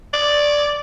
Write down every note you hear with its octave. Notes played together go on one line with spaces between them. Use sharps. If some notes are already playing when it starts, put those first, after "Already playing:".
D5